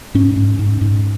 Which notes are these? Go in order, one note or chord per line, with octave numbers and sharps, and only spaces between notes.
G#2 C#4
G#2
G#2
G#2